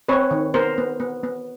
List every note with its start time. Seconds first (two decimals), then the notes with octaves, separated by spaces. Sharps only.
0.08 C4 B4 C#5
0.31 D#3
0.54 B3 A#4 C5
0.78 B3
1.00 B3
1.24 B3